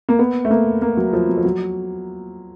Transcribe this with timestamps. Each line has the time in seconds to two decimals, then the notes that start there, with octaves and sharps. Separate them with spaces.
0.09 A#3
0.19 B3
0.45 A3
0.51 A#3
0.82 A#3
0.97 F#3
1.13 F3
1.28 F#3
1.37 F3
1.45 F#3